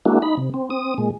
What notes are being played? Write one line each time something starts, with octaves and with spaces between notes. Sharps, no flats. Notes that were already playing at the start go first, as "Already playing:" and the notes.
G#3 A#3 D4 E4 F#4
D#4 B5
C3
C4
C4 D#6
A#2 G#3